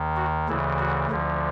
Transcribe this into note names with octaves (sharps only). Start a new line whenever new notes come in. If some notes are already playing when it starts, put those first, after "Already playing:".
Already playing: D#2 D#3
F#4
D2 C#3 E3 E4
F#4
D2 D3 F3